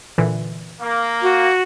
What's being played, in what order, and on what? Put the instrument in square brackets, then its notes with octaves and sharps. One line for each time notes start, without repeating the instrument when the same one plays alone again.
[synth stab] A#2 D3 E3
[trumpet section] A#3
[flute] F#4